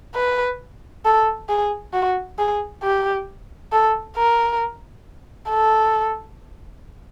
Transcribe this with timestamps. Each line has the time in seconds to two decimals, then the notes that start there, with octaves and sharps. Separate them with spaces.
0.15 B4
1.05 A4
1.49 G#4
1.93 F#4
2.39 G#4
2.83 G4
3.72 A4
4.16 A#4
5.50 A4